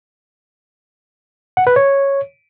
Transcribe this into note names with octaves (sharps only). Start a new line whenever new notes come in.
F#5
B4
C#5